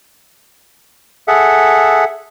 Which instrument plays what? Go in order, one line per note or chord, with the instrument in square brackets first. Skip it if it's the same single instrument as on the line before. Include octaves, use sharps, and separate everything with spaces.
[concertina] G#4 A4 E5 F#5